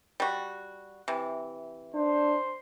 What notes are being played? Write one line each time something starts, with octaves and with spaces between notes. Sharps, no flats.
G3 F#4
C3 E3
D4 C5